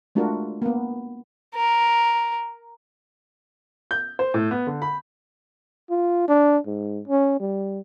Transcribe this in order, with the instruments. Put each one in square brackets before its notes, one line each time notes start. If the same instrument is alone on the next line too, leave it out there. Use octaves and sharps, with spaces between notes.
[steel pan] G#3 A3 D4 F4 F#4 A#4
A#3 B3
[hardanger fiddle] A#4
[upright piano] G6
C5
A2
B3
D3
B5
[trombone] F4
D4
G#2
C#4
G3